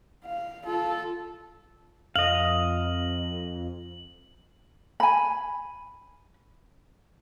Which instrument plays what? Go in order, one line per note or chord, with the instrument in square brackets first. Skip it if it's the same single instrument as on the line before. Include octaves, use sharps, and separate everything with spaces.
[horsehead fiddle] F5
F4 A4
[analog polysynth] F2 [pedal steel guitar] D#5 F5 [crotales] F#7
[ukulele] G#5 B5